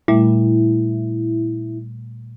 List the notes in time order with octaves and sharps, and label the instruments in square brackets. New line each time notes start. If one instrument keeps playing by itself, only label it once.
[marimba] A#2 G3 A3 [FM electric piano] E4